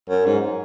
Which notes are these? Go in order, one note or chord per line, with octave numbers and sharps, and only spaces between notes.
F#2
G#2